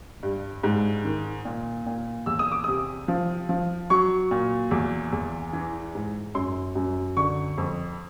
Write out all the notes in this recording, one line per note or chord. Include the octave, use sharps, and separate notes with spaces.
G2
G#2
D#3
A#2
A#2
E2 E6
D#6
D6
C3 D#6
F3
F3
F#3 C#6
A#2
E2
E2
E3
G#2
F#2 C6
F#2
D3 C#6
F2